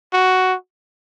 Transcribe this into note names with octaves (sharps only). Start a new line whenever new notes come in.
F#4